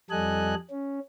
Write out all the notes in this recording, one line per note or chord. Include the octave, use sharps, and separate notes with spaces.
F2 G3 A4 D#5 G#5 F#6
C#4